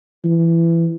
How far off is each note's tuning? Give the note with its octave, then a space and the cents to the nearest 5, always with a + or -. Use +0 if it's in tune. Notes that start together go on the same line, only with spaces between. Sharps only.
E3 +20